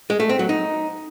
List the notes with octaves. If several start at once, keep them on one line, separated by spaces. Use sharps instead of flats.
G#3
A3
C4
F#3
D#4